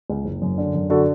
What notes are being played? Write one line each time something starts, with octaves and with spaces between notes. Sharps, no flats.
C#2
F#1
F#2
D3
F#2
D3 F#4 A4